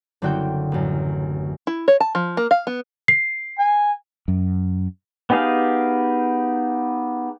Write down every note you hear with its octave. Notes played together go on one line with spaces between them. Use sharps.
F#1 D3 C4 F#4 G5 G6
A1 F#2
E4
C#5
A5
F3
A#3
F5
B3
C7
G#5
F#2
B3 D#4 G4 G#4 F5